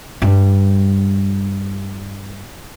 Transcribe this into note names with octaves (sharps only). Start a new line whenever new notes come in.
G2 G3